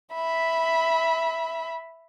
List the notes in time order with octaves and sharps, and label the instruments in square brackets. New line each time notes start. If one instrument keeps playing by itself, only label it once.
[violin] E5 B5